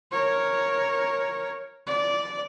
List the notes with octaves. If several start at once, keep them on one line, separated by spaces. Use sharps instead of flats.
A#4 C#5
D5